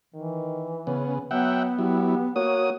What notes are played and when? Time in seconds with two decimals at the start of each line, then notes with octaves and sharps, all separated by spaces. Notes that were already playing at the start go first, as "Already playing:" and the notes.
0.14 D#3 E3
0.87 C#3 B3 C#4
1.31 F#3 B3 E5 F#5 G5
1.79 F#3 E4 G4
2.36 A#3 F#4 C#5 D#6